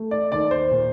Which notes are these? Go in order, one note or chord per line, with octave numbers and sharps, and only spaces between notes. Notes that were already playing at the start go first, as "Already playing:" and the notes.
Already playing: A3
D5
D#2 D5
C5
A#2